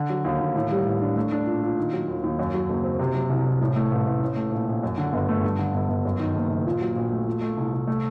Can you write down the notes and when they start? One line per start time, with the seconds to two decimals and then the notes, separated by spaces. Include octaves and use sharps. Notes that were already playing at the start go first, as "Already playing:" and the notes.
Already playing: D3
0.10 F#3
0.25 D#2
0.41 D#2
0.55 A2
0.71 G3
0.86 A1
1.01 D4
1.16 A3
1.32 D4
1.47 A#2
1.63 A#2
1.78 D#3
1.93 F#3
2.08 D#2
2.23 D#2
2.39 F#2
2.54 F#3
2.69 F#1
2.84 C4
2.99 C3
3.15 F#3
3.30 C2
3.46 C2
3.61 A2
3.76 A3
3.91 A1
4.06 A1
4.22 A2
4.36 A3
4.52 A#1
4.68 A#1
4.83 F#2
4.98 D3
5.13 G1
5.29 A3
5.43 G2
5.59 D3
5.74 G1
5.89 G1
6.05 F#2
6.20 D#3
6.36 F#1
6.51 F#1
6.66 A#2
6.81 F#3
6.96 A#1
7.12 A3
7.27 A#2
7.42 A3
7.57 C2
7.73 C2
7.87 A3